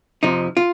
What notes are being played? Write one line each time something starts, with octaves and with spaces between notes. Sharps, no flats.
F2 C3 F3 D#4
F4